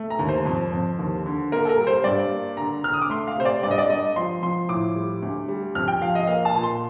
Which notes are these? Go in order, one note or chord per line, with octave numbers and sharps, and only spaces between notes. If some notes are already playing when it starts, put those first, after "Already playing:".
Already playing: A3
A#5
D#2
C5
F2
F2
D#2
D3
A#3 A#4
A4
A#4
G3
C5
G2 D5
A#3
D3 A#5
D3 F6
D#6
D6
A3 C6
F5
C3 C5
D5
G2 D5
D#5
D5
G2 D#5
F3 C6
F3 C6
A2 D6
G3
D2
G3
F2 F6
G5
F3 F5
D#5
A#3 F5
A5
A#2
C6